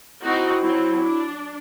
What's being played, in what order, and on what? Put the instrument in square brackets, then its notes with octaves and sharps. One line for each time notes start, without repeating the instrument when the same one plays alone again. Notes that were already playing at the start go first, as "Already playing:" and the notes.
[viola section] C4 D#4 F#4 [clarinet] E4
[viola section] F#3 C4 [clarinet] E4
[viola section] D4